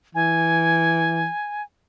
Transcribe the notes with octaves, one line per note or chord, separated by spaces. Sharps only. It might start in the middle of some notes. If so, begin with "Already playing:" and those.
E3 G#5